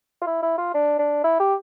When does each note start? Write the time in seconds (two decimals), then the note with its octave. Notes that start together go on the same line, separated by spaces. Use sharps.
0.21 F4
0.26 E4
0.42 E4
0.58 F4
0.74 D4
0.99 D4
1.24 E4
1.40 G4